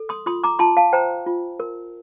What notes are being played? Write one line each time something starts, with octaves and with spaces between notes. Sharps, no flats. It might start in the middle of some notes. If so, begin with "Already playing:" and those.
Already playing: A4
C6 D#6
F4 C6 D#6
A#5 D6
F4 A5 C6
F5 A5
C5 G5 A#5
F4
A#4